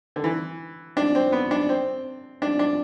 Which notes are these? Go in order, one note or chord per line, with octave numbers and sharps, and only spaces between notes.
D3
E3
D4
C4
B3
D4
C4
D4
D4